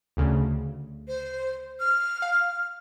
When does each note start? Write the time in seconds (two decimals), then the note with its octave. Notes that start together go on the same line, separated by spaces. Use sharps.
0.17 D2 C#3
1.08 C5
1.80 F6
2.22 F5